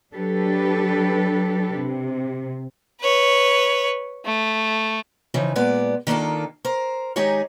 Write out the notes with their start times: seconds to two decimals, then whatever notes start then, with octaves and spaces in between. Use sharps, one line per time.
0.14 F#3 D4 G4 A4 B4
1.76 C3
3.01 B4 C#5
4.25 A3
5.34 C#3 E3 F3 D#4
5.55 A#2 G#3 B3 D5
6.07 D#3 A#3 D4 F4 A4
6.65 A#4 C5
7.16 D#3 G#3 D#4 G4 G#4 C#5